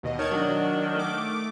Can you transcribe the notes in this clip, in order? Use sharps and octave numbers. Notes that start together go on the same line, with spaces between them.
D#2 B2 D#5
D#3 C#5 A5 G#6
F#3 D4 F#4
A3 D6